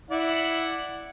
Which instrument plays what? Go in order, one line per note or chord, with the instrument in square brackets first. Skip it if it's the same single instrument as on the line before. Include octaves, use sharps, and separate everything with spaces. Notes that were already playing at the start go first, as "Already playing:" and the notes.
[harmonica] E4 D5 F#5